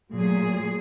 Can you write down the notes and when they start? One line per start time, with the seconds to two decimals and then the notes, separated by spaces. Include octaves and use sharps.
0.13 A#2 F#3 A3 G#4